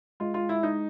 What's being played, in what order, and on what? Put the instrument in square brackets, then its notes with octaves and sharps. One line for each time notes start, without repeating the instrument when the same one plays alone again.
[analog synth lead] G#3 [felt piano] F4
[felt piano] F4
E4
D#4